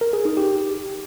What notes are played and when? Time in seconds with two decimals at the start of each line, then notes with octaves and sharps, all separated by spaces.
0.01 A#4
0.13 G#4
0.25 D#4
0.37 G4